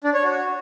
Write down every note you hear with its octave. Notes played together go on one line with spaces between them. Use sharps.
D4
C#5
F#4